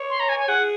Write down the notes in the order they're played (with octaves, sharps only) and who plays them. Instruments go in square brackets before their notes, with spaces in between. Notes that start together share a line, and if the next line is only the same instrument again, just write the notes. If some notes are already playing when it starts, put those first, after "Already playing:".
Already playing: [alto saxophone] C#5
[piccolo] C6
A#5
G#5
G#5
[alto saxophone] G#4 [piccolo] F#5